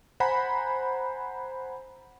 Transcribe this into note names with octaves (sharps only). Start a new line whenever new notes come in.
C5 F#5 G#5 A#5 B5